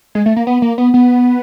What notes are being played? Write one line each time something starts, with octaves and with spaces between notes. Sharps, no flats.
G#3
A3
A#3
B3
A#3
B3
B3